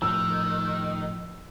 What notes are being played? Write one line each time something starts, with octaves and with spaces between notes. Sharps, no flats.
A2 D#3 F3 E6